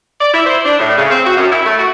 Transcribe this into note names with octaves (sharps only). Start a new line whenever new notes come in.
D5
E4
C5
D4
A2
C#3
C4
F#4
F#2
E4
A3
F#4